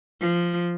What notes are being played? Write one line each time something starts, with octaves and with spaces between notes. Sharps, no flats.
F3